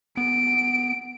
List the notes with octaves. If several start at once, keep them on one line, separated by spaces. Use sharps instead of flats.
B3 D7